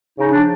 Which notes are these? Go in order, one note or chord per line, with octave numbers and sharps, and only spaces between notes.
C#3 D#4
F3 D4